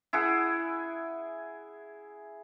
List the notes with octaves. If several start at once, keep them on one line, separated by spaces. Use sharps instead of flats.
E4 G#4 F#5